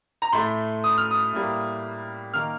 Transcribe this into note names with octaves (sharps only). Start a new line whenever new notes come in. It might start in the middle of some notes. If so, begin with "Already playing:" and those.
A#5
A2 A3 C6
D#6
F6
D#6
A2 G3 A#3
D#3 A#3 F6